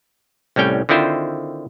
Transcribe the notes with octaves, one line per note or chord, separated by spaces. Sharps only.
C2 A2 G3 C#4 G5
D3 D#3 C4 E4 F4 C5